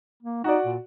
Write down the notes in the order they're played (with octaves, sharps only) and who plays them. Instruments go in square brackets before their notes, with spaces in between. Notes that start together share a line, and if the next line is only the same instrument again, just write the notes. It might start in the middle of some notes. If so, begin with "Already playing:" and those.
[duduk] A#3
[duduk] D#4 [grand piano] F#4 D5
[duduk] A#2